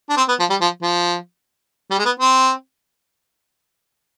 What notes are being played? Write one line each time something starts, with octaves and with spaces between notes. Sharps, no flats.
D4
C4
B3
F3
G3
F3
F3
G3
G#3
B3
C4